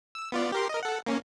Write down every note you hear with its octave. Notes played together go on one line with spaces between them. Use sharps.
E6
B3 F4 D5
G4 A#4 C6
A#4 D#5
A4 F#5
A#3 C#4